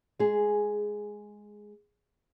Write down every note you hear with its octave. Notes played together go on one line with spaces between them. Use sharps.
G#3 G#4